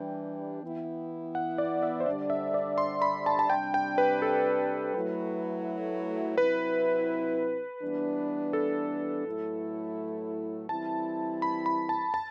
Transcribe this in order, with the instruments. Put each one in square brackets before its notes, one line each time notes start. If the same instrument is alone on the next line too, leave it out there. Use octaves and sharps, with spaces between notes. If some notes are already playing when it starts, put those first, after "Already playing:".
Already playing: [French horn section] E3 G3 D4 [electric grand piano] G5
[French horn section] E3 B3 E4
[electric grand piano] F#5
D5
E5
C5
[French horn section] D3 G3 D4 [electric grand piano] D5
[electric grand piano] E5
D5
C6
B5
A5
A5
[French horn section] C3 G3 D4 [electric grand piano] G5
[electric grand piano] G5
B4
A4
[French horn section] F#3 A3 E4 [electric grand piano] B4
[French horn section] C3 F#3 C4 E4 [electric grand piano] B4
[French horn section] E3 G3 B3 D4
[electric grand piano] A4
[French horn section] A2 F#3 A3 E4
[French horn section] E3 G3 C4 E4 [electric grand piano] A5
[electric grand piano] B5
B5
A5
A5